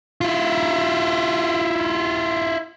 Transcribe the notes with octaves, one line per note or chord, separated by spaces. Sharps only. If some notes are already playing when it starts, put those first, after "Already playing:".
E4 F4